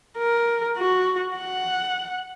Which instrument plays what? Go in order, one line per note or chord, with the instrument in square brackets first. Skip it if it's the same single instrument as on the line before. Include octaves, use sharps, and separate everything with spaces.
[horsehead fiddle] A#4
F#4
F#5